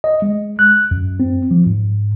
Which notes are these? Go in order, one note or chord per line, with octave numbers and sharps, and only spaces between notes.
D#5
G#3
F#6
F#2
C4
F3
G#2